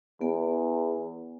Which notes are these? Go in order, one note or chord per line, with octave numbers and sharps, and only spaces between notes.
E2 B3